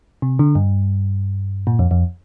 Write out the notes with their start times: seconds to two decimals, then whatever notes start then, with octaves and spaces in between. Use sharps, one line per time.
0.22 C3
0.39 D3
0.55 G2
1.67 A#2
1.79 F2
1.91 F2